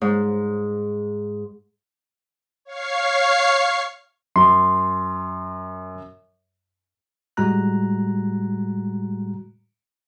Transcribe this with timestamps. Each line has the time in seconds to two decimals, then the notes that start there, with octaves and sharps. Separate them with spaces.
0.01 G#2
2.65 C#5 F5 C#6 C7
4.36 F#2 C6
7.37 A2 G3 G#3 F#4 A#5 F#6